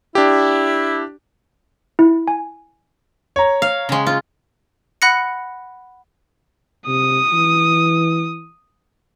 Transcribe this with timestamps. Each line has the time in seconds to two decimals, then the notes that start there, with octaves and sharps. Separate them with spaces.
0.15 D4 E4 G4
1.99 E4
2.28 G#5
3.36 C#5 A#5
3.62 F5
3.89 C#3 G#3
4.07 F4
5.02 F#5 B5 F#6 A#6 C#7
6.87 C3 D#6
7.33 E3